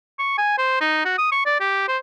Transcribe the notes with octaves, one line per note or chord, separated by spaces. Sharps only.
C#6
G#5
C5
D#4
F#4
D#6
C#6
D5
G4
C5